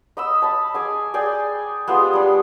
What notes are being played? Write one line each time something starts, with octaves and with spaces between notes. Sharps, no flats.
D#5 B5 E6
A5 B5
G#4 G#5 D6
G#4 D5 G5 G#5
G#3 B3 F4 G4
G3 D4